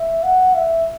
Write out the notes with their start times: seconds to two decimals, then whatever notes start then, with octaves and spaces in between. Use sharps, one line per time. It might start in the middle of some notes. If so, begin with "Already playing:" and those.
Already playing: E5
0.23 F#5
0.55 E5